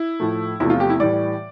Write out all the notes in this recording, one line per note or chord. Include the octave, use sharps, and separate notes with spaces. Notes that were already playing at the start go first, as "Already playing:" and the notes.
Already playing: E4
A2 F3 A3
E2 C3 F3 A3 E4
F4
G4
E4
A2 E3 G3 D5